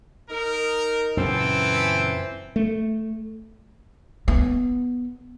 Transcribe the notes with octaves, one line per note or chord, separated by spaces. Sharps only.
D#4 A#4
F#2 A#2 C#3 E3 C4 A4
A3
B3